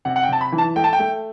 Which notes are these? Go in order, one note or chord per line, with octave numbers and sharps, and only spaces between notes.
C3 F#5
F#5
G5
C3 A5
B5
E3
A5
A3 G5
A5
G5
A3